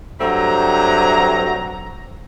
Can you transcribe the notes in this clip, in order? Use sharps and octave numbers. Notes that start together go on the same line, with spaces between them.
G2 F#3 A3 C4 A#5